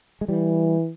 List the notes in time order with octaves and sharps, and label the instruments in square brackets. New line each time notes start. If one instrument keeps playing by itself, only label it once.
[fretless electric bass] G#3
[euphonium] E3 [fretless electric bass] G3